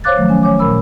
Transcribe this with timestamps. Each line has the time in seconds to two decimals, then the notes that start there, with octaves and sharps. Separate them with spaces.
0.04 C5 C#5 F5 D6 F#6 A6
0.16 D#3 F3 F#3 A3
0.29 C#4 G#5
0.43 C#5 G#5 D6
0.59 A#2 A#4 B5 E6